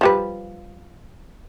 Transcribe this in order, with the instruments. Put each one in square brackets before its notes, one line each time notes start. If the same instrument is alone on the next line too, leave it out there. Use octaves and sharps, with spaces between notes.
[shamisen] F3 G3 B4